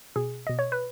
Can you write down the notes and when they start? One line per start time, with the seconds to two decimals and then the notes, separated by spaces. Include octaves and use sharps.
0.16 B2 G#4
0.47 B2 D#5
0.59 C#5
0.72 B4